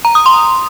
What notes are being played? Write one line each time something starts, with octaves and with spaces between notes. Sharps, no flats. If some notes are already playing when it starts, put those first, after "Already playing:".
A#5
D#6
C6